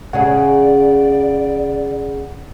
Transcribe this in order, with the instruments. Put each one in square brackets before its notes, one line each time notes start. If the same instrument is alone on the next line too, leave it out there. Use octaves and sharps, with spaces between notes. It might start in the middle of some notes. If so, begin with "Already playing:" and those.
[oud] C#3 C#4 G#4 [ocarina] D5 [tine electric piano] F#5